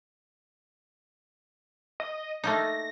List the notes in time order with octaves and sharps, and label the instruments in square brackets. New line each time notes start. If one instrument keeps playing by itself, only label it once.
[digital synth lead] D#5
[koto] A3 A#3 D#4 [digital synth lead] A#6